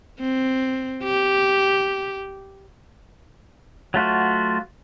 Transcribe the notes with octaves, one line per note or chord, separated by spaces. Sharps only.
C4
G4
F#3 A3 F4 F#4